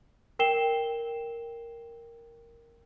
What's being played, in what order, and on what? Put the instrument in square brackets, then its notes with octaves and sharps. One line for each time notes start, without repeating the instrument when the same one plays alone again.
[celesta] A#4 G5 C7 E7 G7